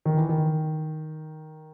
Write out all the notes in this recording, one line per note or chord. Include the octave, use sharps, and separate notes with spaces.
D#3
E3
D#3